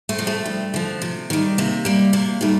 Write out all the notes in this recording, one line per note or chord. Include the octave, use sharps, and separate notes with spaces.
A3 C4
C3 F3
A3
G2
D3 F3
C3
D#3 G3
C3 A#3
G3 A#3
C3 A#3
D#3 G3 A3